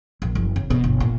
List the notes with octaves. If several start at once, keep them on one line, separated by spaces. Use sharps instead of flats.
A#1
F#1
C#3
B2
G1
A#2